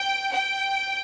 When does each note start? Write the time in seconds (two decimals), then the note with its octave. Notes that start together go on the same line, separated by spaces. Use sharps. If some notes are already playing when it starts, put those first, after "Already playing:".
Already playing: G5
0.33 G5